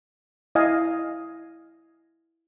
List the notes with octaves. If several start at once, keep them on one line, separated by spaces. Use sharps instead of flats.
E4 D#5 F5 G#5